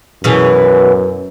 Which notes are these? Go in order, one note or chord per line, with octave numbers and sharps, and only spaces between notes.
F#2 B2 E3 G#4